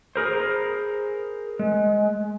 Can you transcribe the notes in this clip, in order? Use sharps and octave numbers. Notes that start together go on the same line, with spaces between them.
G#4 A#4 C5
G#3